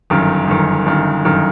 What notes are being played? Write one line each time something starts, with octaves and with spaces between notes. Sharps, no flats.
G1 F#2 D#3
G1 F#2 D#3
G1 F#2 D#3
G1 F#2 D#3